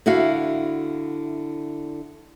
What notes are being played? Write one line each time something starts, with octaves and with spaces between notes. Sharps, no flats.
D3 E4 F#4 E5 F5